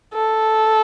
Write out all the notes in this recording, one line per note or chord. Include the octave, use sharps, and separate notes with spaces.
A4